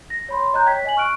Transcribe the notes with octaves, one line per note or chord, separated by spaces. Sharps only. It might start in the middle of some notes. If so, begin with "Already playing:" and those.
A#6
C#5 B5 C6
C#5 D#5 A#5 F#6 G6
C#5 G5 G#6 B6
D#5 G#5 F#7
C#6 F6 F#6 D7